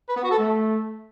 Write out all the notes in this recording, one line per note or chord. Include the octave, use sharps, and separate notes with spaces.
B4
B3
F#4
A4
A3